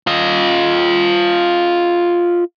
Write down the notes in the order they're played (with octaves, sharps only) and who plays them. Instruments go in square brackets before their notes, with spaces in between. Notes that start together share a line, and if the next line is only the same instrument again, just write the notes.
[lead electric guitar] F4 D#5